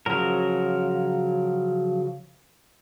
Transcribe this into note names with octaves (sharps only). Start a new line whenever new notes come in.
C#3 F3 F#3 A#4